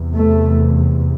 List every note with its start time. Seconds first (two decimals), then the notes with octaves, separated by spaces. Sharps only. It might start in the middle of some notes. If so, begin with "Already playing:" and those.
Already playing: E2 C3
0.15 A3